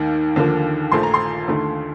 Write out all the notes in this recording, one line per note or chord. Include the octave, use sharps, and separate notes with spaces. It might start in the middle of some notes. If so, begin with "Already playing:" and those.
Already playing: D#2 D#3 A#3
D#2 D3 F3 A#3
A#1 A#2 F3 A3 C6
A#5
C6
D#2 D3 A3